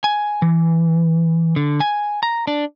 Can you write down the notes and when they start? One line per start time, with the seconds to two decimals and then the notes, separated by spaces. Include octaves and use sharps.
0.04 G#5
0.42 E3
1.56 D3
1.80 G#5
2.23 A#5
2.47 D4